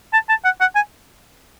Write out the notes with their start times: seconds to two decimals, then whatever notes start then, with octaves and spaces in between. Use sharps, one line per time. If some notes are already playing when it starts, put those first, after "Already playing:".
0.13 A5
0.29 A5
0.45 F#5
0.61 F#5
0.75 G#5